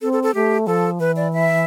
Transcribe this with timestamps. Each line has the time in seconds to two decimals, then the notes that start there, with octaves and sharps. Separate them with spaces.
0.02 C4 A4
0.13 A4
0.23 A4
0.35 A3 G4
0.67 F3 A4
1.00 E3 B4
1.16 D5
1.33 E5